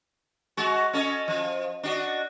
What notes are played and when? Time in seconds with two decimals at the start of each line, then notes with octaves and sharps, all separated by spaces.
0.57 G#3 F#4
0.93 C#4 A4 D#5
1.28 F3
1.83 D4 F#4 D#5